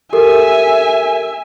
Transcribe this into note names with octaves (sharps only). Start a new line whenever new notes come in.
G4 A4 A#4 E5 G#5